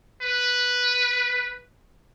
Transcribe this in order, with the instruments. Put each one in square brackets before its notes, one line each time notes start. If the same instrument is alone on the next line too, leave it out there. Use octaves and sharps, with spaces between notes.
[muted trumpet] B4